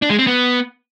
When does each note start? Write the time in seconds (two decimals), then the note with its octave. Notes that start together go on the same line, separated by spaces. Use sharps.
0.02 D4
0.10 G#3
0.18 C4
0.27 B3